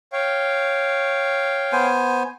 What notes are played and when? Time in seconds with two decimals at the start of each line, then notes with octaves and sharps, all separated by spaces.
0.13 C#5 F5 G5
1.73 B3 C5 G#5